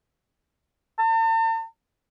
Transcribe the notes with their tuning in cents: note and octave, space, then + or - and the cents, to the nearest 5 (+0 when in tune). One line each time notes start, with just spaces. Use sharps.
A5 +45